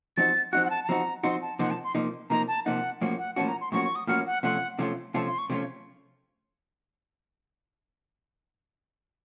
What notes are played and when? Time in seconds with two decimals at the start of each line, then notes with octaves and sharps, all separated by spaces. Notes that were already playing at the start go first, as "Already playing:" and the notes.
0.17 F3 C4 D#4 F#4 A6
0.53 F3 C4 D#4 F#4 F#6
0.65 F#5
0.70 A5
0.84 A5
0.89 F3 C4 D#4 F#4 A#5
1.23 F3 C4 D#4 F#4 C6
1.42 A5
1.59 C3 F3 A#3 D#4 F#5
1.71 A5
1.84 C6
1.95 C3 F3 A#3 D#4
2.30 C3 F3 A#3 D#4 A#5
2.48 A5
2.65 C3 F3 A#3 D#4 F#5
3.01 A2 F3 A#3 C#4 F#4
3.19 F#5
3.36 A2 F3 A#3 C#4 F#4 A5
3.48 A#5
3.61 C6
3.72 A2 F3 A#3 C#4 F#4 C#6
3.84 C#6
3.96 D#6
4.07 A2 F3 A#3 C#4 F#4 F6
4.26 F#5
4.43 C3 F3 A3 C#4 F4 F#5
4.79 C3 F3 A3 C#4 F4
5.14 C3 F3 A3 C#4 F4 A5
5.27 C6
5.38 C#6
5.50 C3 F3 A3 C#4 F4